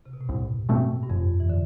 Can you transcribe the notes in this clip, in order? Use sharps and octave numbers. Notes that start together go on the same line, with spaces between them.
C3
B2
A2
C2 G2
B2 A3 C4
G2
F1 F2
E3
D3